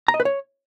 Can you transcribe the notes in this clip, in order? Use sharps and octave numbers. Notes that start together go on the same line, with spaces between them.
A#5
D#5
B4
C#5